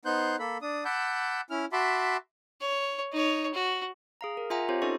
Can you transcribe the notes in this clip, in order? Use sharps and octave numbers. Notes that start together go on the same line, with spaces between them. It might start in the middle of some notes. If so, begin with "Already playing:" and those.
B3 D#4 C5 C6 F#6 G6
A#3 A4 B5
D4 D#6
F#5 A5 B5 D6 E6 G6
C#4 E4 F6
F#4 E5 A5 B5 C6 D6
C#5
D#4 C#5
F#4
G#4 F5 A#5
A#4
F4 E5 F#5 G#5 A#5
C4 F4 G4 C5 C#5
C#4 D#4 A4 C5 D#5 C#6